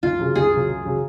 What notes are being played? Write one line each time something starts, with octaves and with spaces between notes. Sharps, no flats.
F#2 F4
C#3 F#3
F#2 G#4
C#3 F#3
F#2
C#3 F#3